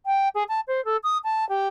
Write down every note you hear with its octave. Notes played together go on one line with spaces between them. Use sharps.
G5
G#4
A5
C5
A4
D#6
A5
G4